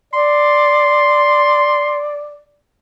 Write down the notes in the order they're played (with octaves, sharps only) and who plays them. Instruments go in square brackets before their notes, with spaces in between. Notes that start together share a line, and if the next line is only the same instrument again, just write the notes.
[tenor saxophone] D5 [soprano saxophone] C6